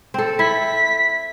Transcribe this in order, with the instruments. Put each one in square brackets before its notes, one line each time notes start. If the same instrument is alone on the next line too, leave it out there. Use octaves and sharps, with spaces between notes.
[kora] C4 A4
[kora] E4 [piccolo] B6